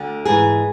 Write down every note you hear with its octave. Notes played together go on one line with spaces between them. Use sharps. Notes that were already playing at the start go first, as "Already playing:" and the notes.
Already playing: D2 D3
G#2 E3 G#4